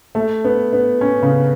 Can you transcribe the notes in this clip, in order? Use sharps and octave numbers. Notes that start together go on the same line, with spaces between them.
A3
B3
B3
C#4
C#3